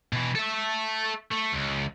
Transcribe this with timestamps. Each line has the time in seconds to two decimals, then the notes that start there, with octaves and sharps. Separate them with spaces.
0.13 B2 E3
0.35 A4 E5
1.32 A3
1.54 C#2